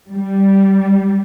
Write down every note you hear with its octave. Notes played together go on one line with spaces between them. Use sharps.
G3